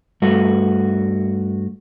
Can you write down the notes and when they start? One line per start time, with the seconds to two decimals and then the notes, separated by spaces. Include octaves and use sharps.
0.22 G2 A3 F#4